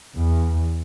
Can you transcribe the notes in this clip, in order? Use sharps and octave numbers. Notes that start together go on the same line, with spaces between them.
E2